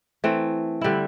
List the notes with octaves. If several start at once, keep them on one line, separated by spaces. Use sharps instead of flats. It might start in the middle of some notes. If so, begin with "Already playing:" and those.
E3 A3 C4
D3 G3 E4